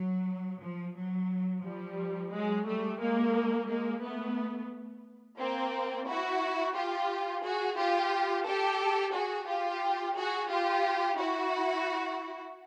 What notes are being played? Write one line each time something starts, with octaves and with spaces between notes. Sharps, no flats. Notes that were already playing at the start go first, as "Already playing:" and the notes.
Already playing: F#3
F3
F#3
F3 G3
F#3 G#3
G3 A3
G#3 A#3
G#3 A#3
A3 B3
A#3 C4
E4 F#4
F4 G4
F#4 G#4
F4 G4
G4 A4
F#4 G#4
F4 G4
F#4 G#4
F4 G4
E4 F#4